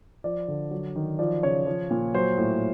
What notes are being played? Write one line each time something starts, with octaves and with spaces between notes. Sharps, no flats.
F3 D5
D3
F#3
D#3
F3 D5
C#3 C#5
F3
A#2
F#3 C5
A2